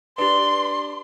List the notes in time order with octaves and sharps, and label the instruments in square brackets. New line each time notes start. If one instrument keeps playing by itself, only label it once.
[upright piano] D4 [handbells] G4 B4 [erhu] C6